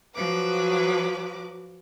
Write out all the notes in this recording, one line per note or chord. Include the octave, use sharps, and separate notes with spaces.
F3 F#3 B4 D6